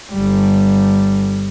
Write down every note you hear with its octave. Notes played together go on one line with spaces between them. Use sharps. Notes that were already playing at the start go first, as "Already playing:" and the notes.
G1 G3